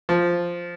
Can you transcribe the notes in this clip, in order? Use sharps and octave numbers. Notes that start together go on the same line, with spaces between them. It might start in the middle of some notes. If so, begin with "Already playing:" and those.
F3